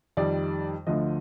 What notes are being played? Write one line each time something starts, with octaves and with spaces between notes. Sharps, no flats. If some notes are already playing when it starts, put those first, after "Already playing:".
F2 D#3 G3 D5
D2 D3 F3 D#5